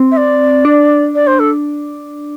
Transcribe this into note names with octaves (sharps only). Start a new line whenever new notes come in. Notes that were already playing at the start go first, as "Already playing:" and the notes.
Already playing: C4
E5
D5
D4
D5
C5
A4